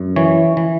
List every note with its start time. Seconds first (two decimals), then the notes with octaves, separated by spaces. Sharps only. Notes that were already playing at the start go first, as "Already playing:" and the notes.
Already playing: F#2
0.16 E3 C#5
0.57 E3